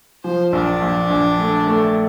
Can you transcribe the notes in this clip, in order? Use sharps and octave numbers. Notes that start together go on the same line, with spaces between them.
F3 C5
A#1 D4
A#1
A#1
A3
A3